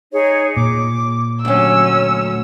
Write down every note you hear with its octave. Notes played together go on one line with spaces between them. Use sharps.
D#4 G#4 C#5
A#2 D6
D2 F#3 C#4 E6